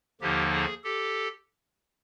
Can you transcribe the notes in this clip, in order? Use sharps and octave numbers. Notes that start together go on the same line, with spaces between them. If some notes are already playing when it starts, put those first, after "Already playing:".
D#2 D3 F3 A#3 D#4 G4
G#4
G4 A4